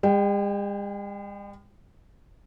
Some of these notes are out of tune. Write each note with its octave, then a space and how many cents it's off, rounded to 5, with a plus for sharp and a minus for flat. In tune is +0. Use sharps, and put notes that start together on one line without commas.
G#3 -45 G5 +0